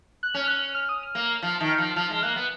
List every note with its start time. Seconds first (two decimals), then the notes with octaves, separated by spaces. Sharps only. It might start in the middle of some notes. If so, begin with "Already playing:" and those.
0.23 F#6
0.34 C#4 F6
0.48 F#6
0.74 F6
0.89 D#6
1.03 F6
1.15 A#3
1.42 F3
1.60 D#3
1.78 F3
1.96 F3 F6
2.10 G#3
2.23 A#3 F#6
2.36 B3